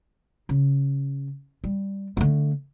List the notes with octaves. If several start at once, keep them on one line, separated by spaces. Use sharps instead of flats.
C#3
G3
D3 A3